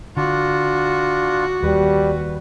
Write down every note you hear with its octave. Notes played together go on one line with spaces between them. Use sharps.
D3 D4 F4 F#4
D#2 G3 B4